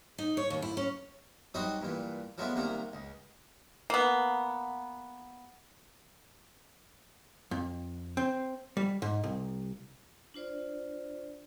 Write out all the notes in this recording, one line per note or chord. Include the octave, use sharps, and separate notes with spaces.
D#4
C#5
D#2
E4
C#4
F#3 G3 C4 D#4 F#4 D#5
G2 A#2 E3
F3 F#3 G#3 A3 B3 D4
C2 C3 D#3 A#3 A#5
C#2
A#3 B3
F2
C4
G3
G#2
C2
D4 F4 C5 D5